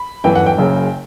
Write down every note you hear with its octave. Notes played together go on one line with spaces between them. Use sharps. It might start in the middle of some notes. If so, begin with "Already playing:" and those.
Already playing: B5
G1 F#2 E3 G5
F#5
G5
F#1 F#2 C#3